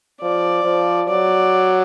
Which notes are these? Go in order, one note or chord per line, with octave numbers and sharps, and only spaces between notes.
F3 D5
F3
F#3 D5